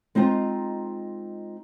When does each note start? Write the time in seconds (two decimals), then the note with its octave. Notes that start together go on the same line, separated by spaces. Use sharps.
0.15 G#3 C4 D#4 F4 A#5